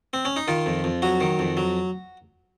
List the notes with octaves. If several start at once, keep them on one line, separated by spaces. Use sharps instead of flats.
C4
C#4
D#4
D#3 F4
F2
F2
F#3 F#4
D#3
F2
F#3